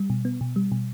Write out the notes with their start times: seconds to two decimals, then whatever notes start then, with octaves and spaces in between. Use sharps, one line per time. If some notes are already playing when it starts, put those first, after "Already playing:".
Already playing: G3
0.10 B2
0.25 B3
0.41 B2
0.56 G3
0.72 B2